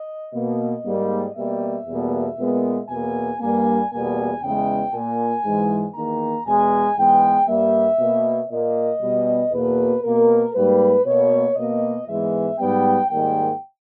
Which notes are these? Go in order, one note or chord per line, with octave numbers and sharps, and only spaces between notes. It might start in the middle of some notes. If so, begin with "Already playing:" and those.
Already playing: D#5
B2 A#3 D#5
G#2 G3 A#3
B2 G3 A#3 E5
E2 B2 G3 A#3
A#2 G#3 B3
E2 B2 A#3 G#5
G2 G3 A#3 G#5
E2 B2 G3 A#3 G#5
E2 C#3 E3 G#3 G5
A#2 A#3 G#5
G#2 E3 G#3
E2 D#3 A#3 A#5
E2 B2 G#3 B3 G#5
G#2 E3 G#3 B3 G5
G2 G3 A#3 E5
B2 A#3
A#2 A#3 D#5
B2 G3 B3
E2 B2 A#3 B4
B2 A#3 A#4
G#2 G3 A#3 B4
B2 A#3 C#5
B2 A#3 D#5
G#2 E3 G#3 B3 E5
G#2 G3 B3 G5
G#2 D#3 G3 A#3 G5